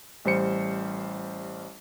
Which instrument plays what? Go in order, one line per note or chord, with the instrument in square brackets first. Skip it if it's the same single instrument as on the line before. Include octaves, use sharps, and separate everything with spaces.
[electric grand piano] A1 G3 C5 C#7